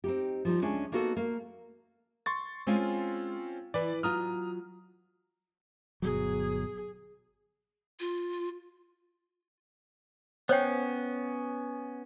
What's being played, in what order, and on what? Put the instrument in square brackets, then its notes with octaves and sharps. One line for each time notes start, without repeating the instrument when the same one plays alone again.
[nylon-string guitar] C4 D#4 G4
F3 G3 D#4
D2 G#3 C#4 D4 A5
A#3 B3 D#4 F#4 A4
A#3
[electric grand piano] C6 C#6 A6
[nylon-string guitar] G#3 G#5 [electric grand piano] C4 C#4 F4
[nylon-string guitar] E3 [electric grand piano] B4 D5
[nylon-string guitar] F#3 F4 [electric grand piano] A#5 D#6 F6
[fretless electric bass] G1 B2 F#3 [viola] G#4
[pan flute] F4
[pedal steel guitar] B3 C#4 [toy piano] C5 C#5 G5